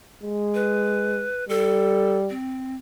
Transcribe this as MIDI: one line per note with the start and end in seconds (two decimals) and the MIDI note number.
0.23 1.27 56
0.54 1.45 71
1.49 2.31 55
1.49 2.17 69
2.30 2.75 60